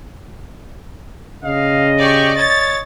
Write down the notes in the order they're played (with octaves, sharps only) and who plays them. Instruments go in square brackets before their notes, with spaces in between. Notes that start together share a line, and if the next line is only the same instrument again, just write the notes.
[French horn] C#3 [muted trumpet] D#5 [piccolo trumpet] F5
[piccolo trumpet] G4 [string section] D5 C#6
[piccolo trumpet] C#5 [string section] A6